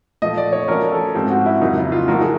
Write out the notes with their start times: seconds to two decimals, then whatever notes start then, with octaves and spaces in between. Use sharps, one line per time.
0.22 A#2 F3 A3 D#5
0.37 D5
0.52 C#5
0.68 F3 A3 C#4 F#4 A#4
0.91 A4
1.14 G#2 F3 G#3 C4 G4
1.30 F#4
1.46 E4
1.61 F2 C#3 F#3 A#3 D#4
1.77 E4
1.92 F4
2.08 A2 F3 A#3 D#4 F#4 A#4
2.21 G#4